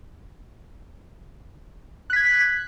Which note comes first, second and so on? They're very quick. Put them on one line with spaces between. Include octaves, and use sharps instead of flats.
F#6 B6 G#6